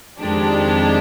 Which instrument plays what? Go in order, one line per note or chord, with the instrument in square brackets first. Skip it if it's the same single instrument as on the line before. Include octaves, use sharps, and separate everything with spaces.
[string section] F2 D#3 G#3 D4 G4